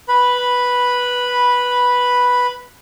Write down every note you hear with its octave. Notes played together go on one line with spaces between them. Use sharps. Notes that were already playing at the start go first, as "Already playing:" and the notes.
B4 B5